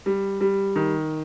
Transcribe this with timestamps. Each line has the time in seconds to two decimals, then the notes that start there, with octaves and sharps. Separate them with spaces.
0.06 G3
0.41 G3
0.76 D#3